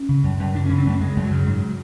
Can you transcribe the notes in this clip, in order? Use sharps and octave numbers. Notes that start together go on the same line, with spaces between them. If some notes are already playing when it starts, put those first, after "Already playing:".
Already playing: C#4
C#3
F#2
F#2
C#3 D4
C#4
C#3
C4
F#2 A3
F#2 G#3
F#2
F#3
C#3
G#2